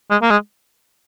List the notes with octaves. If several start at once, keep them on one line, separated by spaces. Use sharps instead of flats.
G#3
A#3
G#3